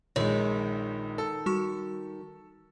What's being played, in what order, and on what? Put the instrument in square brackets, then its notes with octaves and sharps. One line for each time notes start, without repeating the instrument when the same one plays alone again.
[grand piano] A#1 G#3 [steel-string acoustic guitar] D#3 [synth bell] C#5
[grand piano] A4
[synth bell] G3 F#4 C#6